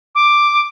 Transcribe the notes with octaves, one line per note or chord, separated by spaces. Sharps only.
D6